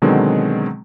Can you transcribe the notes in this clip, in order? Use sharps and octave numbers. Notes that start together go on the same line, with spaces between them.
B2 D3 D#3 F#3 G#3 C4